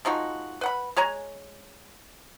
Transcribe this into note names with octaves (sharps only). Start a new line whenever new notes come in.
F3 G#3 D#4 F#4
B4 F#5 B5
G#3 C#5 G#5 A#5